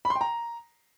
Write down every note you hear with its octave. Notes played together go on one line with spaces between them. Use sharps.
B5
C6
G5
A#5